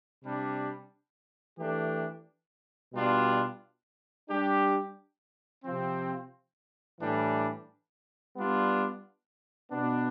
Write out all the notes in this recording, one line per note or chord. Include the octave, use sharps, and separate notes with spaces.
C3 G3 D4
E3 A3 D4 G4
B2 G3 D4 F4
G3 D4 G4
C3 F3 C4
A2 E3 G3 D4
G3 B3 D4 F4
B2 B3 D4